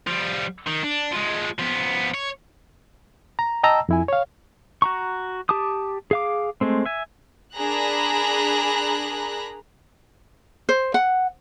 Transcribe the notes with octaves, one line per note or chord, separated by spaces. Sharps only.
F3 G3
D#3
D4
F3 G#3
F3 B3
C#5
A#5
D#5 G5 A5 A#5 E6
F2 E4 G#5
C#5 F5
F#4 A#5 C#6
G4 A5 D6 D#6
G#4 F5 D6
G#3 A3 C4
E5 G#5
D4 G#4 A#4 A#5 B5 F#6
C5
F#5